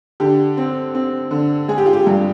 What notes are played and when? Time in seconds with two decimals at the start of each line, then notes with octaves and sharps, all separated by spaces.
0.20 D3 G4
0.57 C4
0.95 C4
1.31 D3
1.68 G#3 G#4
1.78 G4
1.86 F4
1.93 G4
2.07 G2